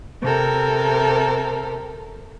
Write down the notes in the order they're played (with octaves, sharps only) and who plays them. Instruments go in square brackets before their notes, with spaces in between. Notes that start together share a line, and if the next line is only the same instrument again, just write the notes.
[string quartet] C3 A4 A#4